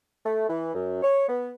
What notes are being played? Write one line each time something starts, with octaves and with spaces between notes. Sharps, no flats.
A3
E3
F#2
C#5
B3